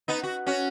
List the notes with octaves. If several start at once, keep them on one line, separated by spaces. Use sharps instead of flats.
B3 D#4
F#4
C#4 F#4